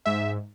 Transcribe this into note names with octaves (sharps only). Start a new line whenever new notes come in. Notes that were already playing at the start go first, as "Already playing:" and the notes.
G#2 E5